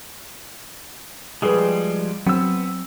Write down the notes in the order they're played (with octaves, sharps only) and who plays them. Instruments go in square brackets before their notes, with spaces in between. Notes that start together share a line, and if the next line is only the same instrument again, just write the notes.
[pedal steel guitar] F3 G3 G#3 [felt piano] G#4 B4
[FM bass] F#3 [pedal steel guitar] B3 E6 [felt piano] C4